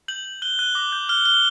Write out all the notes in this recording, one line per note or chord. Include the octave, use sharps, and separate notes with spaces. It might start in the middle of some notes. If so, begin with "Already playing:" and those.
G6 F#7
G6
F#6 G7
F#6
D6
G6
F6 G7
F6 G7